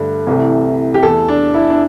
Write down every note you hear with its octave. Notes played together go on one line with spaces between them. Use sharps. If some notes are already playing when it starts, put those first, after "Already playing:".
Already playing: G2 D3 A3
C2 C3 E3 A3
G4
E2 E3 A3 A4
D4
E4
D4